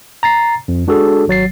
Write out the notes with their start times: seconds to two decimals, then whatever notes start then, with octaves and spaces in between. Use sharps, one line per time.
0.23 A#5 A6 C7
0.68 F2
0.87 G#3 D4 F#4 G#4 A4
1.28 G#1 F#3 A6 C7